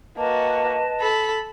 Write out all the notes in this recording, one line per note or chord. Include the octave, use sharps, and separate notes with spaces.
A#3 F#4 B4 D#5 A5
A4 B5